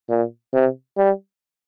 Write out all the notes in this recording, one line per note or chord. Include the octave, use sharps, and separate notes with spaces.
A#2
C3
G3